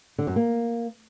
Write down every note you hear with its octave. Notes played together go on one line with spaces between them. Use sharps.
D3
F#2
A#3